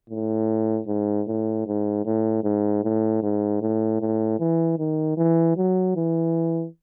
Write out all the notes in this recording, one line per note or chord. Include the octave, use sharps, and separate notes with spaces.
A2
G#2
A2
G#2
A2
G#2
A2
G#2
A2
A2
E3
D#3
E3
F#3
E3